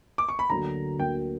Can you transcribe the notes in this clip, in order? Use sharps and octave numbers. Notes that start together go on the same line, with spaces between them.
D6
C#6
B5
D2 D3 F#3 A#3 A#5
D2 D3 F#3 A#3 G5